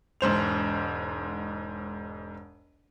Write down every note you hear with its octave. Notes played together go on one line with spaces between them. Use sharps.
E1 G#2 C5 F7